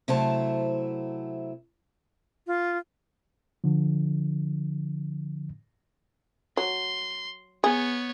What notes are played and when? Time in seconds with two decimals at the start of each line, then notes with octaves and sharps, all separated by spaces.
0.08 C3 F#3 A3 E4 C5 A5
2.47 F4
3.64 D3 F3
6.57 F#3 C6
7.64 B3 G#4 C#5